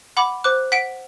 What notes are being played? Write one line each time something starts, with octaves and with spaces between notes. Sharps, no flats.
F#5 B5 D6
C5 D6 F#6
F#5 B6 D7